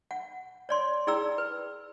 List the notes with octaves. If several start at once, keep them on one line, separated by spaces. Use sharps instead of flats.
F#5
C#5 D5 C6
E4 G#4 D5 G5 A#5 E6
B4